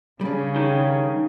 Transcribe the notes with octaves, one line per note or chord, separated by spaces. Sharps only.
C#3 G3 D4
D#3